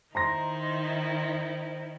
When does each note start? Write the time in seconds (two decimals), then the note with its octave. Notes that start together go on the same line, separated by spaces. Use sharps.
0.15 D#3 D#4 E4 C5 A#5 C6 A#6